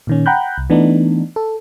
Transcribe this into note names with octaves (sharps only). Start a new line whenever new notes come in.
A#2 D#3 C#4
F#5 G5 A#5 B5 F#6 G6
C2
E3 A3 B3 D4 D#4
A4